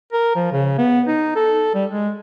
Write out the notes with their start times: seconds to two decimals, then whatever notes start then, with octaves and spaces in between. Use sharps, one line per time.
0.13 A#4
0.35 F3
0.52 C#3
0.78 B3
1.07 D#4
1.35 A4
1.75 G3
1.90 G#3